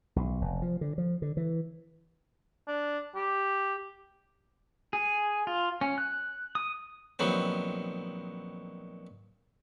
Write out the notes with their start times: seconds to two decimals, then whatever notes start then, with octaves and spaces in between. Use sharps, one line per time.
0.16 B1
0.41 F1
0.62 F3
0.81 D3
0.98 F3
1.22 D3
1.37 E3
2.67 D4
3.15 G4
4.93 G#4
5.47 F4
5.81 C#4
5.98 F#6
6.55 D#6
7.19 A#1 D#3 F#3 B3 C4